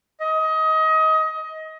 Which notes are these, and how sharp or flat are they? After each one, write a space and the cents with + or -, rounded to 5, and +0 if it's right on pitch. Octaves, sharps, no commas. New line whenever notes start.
D#5 +25